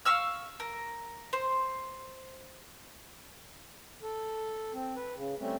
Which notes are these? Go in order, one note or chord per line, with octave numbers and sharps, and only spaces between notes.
F5 C#6 E6 F6
A#4
C5
A4
C4
B4
C#3
G3 A3 C4 C#4